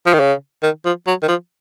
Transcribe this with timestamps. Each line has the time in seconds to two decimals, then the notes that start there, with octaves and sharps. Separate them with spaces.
0.06 F3
0.14 D#3
0.20 C#3
0.63 D#3
0.85 F3
1.07 F#3
1.23 D#3
1.28 F3